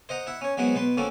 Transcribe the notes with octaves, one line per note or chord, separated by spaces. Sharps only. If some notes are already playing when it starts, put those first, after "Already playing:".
C5 D#5 F#5 A#5
E4 E5 F#5
C#4 C#5
F#3 G#3 B3 C4 F#4 F#5
B2 B4 C6
A#3 C4 C#4 F#4 A4